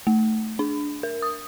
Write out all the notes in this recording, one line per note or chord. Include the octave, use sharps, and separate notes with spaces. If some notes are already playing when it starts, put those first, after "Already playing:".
A3
D4
A#4
D#6